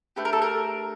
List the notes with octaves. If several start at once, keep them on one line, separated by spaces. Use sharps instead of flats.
A3 D4 G4 B4
A#4
A4
A#4